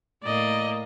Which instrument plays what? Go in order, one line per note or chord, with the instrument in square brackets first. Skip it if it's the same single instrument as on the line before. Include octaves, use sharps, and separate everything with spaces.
[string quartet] A2 A#3 [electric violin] D5 D#5